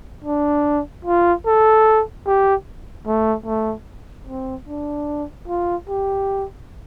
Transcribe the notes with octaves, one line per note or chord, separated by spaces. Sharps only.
D4
F4
A4
G4
A3
A3
C4
D4
F4
G4